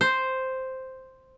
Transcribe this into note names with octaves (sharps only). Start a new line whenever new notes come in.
C5